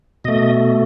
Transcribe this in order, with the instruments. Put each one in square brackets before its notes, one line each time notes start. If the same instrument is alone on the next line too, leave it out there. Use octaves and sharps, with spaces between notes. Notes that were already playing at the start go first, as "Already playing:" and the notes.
[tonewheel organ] B2 A3 D#5